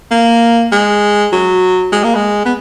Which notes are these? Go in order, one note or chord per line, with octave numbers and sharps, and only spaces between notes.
A#3
G#3
F#3
G#3
A#3
G#3
B3